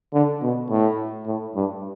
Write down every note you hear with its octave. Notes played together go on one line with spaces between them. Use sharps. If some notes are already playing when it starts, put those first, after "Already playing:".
D3
B2
A2
A2
G2